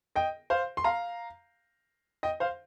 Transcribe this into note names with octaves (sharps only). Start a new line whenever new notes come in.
D#5 G5
C5 F5
C6
F5 A#5
D#5 G5
C5 F5